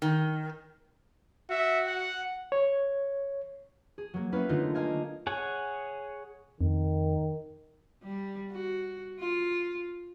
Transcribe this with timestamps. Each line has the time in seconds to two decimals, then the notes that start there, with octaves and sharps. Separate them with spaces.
0.02 D#3
1.50 F#4 E5
1.87 F#5
2.52 C#5
3.98 G#4
4.14 F#3 A#3
4.32 A#3 B3 C#4 E4 B4 F5
4.49 D3 A3 D#4 F4 A#4
4.75 A#3 D#5 F5 G#5
5.27 G#4 C#5 F#5 G#5
6.61 F2 D#3
8.04 G3
8.52 F#4
9.20 F4